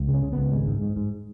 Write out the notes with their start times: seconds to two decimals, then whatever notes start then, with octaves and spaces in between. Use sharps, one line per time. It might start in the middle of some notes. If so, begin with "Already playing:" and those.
Already playing: C#2
0.08 C#3
0.14 C#4
0.22 C#3
0.33 C#2 B3
0.52 G#1 G#3
0.67 G#2
0.82 G#2
0.96 G#2